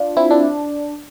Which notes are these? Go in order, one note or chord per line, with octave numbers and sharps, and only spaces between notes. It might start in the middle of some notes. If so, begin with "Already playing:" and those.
Already playing: D4 F4
C4 E4
D4